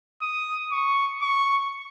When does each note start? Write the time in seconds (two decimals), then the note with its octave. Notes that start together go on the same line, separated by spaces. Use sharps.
0.22 D#6
0.72 C#6
1.21 C#6